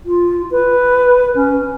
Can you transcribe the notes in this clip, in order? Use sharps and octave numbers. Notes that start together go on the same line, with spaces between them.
F4
B4
C#4